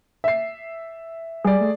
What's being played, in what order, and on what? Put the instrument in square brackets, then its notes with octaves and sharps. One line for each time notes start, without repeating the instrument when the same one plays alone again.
[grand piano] E5 C7
[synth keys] G3 [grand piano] G#4 D5
[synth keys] A3